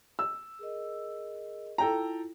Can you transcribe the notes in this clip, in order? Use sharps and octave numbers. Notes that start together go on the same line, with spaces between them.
E6
G#4 A#4 D#5
E4 F4 A4 G5 A#5